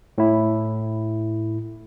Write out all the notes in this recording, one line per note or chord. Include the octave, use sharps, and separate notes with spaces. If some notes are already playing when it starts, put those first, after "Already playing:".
A2 E4